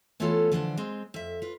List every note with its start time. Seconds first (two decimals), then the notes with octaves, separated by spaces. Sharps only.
0.20 E3 A3 B3 C#4 F4 A4
0.51 D3 E3 F3 G3 B3 D4
0.77 G#3 C4
1.14 F2 E5
1.42 F4 B4